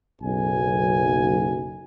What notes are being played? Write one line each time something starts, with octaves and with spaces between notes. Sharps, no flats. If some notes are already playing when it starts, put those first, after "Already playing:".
F#1 B1 G#5